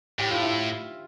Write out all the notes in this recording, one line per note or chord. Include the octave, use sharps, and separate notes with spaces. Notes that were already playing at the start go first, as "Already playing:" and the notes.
A2 G4
F4
E4